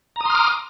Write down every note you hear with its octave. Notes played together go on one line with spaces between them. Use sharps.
A#5 C6 D6 D#6 F6